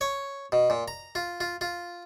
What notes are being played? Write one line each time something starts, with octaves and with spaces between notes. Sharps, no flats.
C#5
B2
A#2
A#5
F4
F4
F4